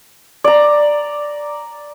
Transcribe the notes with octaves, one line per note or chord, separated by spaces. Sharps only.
D5 A#5